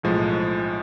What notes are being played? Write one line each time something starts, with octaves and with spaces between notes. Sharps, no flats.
B1 A2 F3 G#3